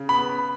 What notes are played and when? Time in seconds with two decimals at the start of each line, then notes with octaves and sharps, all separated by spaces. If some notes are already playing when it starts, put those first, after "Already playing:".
Already playing: C#3
0.09 B3 B5